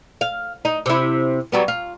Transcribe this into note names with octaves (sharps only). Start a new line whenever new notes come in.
F5
D#4
C3 E4
F#3 G3 B3
F4